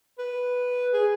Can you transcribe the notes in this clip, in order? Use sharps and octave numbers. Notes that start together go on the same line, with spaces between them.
B4
G#4